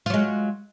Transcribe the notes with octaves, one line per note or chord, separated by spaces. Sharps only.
F#3 G#3 F4